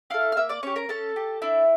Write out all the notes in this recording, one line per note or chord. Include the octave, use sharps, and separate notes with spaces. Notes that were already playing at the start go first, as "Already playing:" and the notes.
E4 A4 F5 F6
F6
A#3 E5 E6
D5 D6
C#4 G4 C#5 C#6
A#4 A#5
C#4 A4 A5
G4
D4 E4 E5